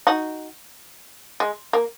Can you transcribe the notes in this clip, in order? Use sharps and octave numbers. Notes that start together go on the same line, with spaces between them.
D#4 F#4
G#3
A#3